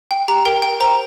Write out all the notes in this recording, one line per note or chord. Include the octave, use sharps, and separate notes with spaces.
G5
G4 A#5
A#4 G5
G5
C5 A#5